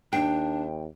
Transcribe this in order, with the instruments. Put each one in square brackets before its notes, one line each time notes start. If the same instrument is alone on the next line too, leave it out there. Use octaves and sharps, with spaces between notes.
[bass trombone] D#2 [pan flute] D4 [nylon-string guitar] G5